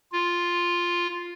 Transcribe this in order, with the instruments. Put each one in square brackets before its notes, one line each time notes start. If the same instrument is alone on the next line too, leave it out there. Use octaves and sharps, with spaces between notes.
[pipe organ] F4